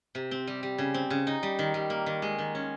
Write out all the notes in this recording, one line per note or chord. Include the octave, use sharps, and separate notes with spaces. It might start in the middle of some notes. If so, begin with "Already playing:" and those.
C3
C4
G3
G3
C#3
C4
C#3
D#4
G3
D#3
G3
A#3
D#3
G#3
D#3
C#4